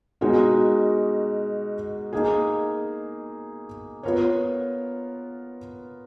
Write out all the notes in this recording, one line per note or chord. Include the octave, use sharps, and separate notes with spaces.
B2 G#3 D#4 F#4 A#4
A#3 D#4 G#4
B3 F4 A#4 C#5